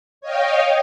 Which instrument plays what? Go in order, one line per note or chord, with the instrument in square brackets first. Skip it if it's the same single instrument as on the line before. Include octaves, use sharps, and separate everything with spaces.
[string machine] C#5 D#5 F5 G5